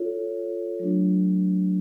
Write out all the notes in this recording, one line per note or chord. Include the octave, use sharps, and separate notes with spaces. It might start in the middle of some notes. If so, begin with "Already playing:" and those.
Already playing: F4 A4 C#5
F#3 A3 D4